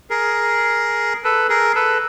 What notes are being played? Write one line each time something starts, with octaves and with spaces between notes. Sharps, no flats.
G#4 A#4
A4 B4
G#4 A#4
A4 B4